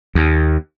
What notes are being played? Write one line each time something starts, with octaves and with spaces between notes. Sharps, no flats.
D#2